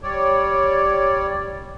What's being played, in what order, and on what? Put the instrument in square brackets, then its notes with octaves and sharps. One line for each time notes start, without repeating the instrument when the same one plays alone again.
[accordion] G3 C#5 D5